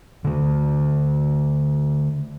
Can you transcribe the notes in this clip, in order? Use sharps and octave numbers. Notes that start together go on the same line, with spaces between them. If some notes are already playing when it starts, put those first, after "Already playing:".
D3 A3